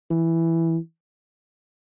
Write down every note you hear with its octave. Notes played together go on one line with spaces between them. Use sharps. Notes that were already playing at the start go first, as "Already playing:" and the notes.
E3